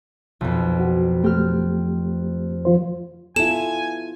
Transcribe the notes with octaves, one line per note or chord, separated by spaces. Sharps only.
B1 F2
F#4
A3 C4 G4 F6
F3 F4 C5
B3 E4 F4 A4 G#5 E7